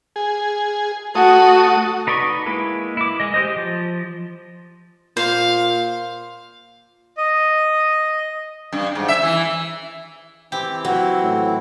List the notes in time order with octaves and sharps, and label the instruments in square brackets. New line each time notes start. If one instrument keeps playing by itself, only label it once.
[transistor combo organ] G#4
[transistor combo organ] A3 D#6 [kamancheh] F#4
[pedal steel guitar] D#4 B4 D5 D#5 C#6
G#3 A#3 E4 B4
E4 D6
G#3 D#5
G4 C5 D#5
F3
[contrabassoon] A#2 [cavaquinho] C5 [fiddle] F5
[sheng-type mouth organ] D#5
[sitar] G2
G#2
E5
E3
[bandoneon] E3 C4 E4 [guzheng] G4
[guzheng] F#3 [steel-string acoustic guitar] F#4
[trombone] A2